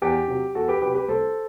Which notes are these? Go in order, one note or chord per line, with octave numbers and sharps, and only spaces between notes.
E2 G4
C3 F#3
E2 F#4 A4
G4 B4
C3 F#3 G4 B4
G4 B4
C2 A4 C5